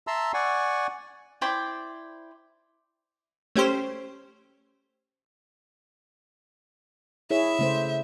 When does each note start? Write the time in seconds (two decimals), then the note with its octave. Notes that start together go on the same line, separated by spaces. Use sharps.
0.07 E5 A5 A#5 C6 E6
0.34 D5 F#5 G#5 C#6
1.41 E4 C5 D5 G5
3.56 A3 C#4 G4 C5
7.30 E4 G#4 C#5 E5
7.59 C#3 A3 C5